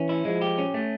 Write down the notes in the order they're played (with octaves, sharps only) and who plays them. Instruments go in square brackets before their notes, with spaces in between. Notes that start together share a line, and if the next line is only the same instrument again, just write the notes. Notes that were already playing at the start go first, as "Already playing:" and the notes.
Already playing: [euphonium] E3 [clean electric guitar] C#4
[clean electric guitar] E4
[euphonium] F3 [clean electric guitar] G#3
[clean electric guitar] G4
C#4
A3